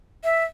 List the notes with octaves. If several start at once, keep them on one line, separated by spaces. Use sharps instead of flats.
E5